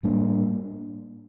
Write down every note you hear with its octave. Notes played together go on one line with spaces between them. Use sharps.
A2 G3 A#3 D4